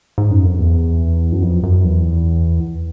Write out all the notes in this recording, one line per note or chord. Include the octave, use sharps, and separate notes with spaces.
G#2
F#2
F2
E2
F#2
F2
F#2
E2